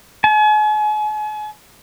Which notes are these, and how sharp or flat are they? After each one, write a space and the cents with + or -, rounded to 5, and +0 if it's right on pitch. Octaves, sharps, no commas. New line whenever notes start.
G#5 +40